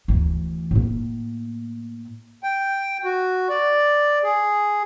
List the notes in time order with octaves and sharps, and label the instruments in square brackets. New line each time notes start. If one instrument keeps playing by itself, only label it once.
[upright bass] D2 E3
A2 A#3
[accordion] G5
F#4
D5
G#4